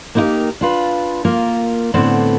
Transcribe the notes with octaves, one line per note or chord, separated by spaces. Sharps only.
A#3 B3 D#4 E4 G4 A#4
D4 F4 B4
A#3 F4 A#4
A2 D3 B3 C4 D4